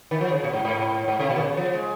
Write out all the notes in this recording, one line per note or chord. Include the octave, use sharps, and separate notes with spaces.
D#3
F3
C#3
A#2
G#2
G#2
G#2
C3
A#2
D#3
C#3
F3
G#3